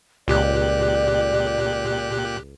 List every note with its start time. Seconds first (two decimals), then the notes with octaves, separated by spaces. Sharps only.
0.28 C#2 A#2 G4 D5 F#6